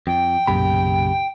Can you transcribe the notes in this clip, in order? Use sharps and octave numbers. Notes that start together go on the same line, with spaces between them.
F2 G5
B1 F#2 A#2 C#3 G4 B5